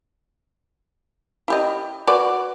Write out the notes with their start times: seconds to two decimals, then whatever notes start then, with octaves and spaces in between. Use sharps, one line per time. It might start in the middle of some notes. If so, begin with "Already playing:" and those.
1.48 E4 G4 D#5
2.07 F#4 B4 D5